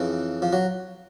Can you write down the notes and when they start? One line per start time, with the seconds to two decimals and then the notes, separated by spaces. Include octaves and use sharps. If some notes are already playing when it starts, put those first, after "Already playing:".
Already playing: F2 C#3 E3
0.42 F3
0.53 F#3